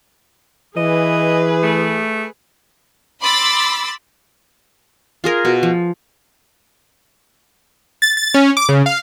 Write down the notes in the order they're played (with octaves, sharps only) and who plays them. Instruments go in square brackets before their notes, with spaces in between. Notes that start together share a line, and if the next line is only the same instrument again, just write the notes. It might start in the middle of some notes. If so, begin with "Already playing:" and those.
[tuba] E3 [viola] G#4 B4 [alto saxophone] D#5
[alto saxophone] A3
[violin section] B5 C6 D6 E6 A6
[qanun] F4 G#4 A#4
B2
F3
[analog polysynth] A6
A6
C#4
D6
C#3
F5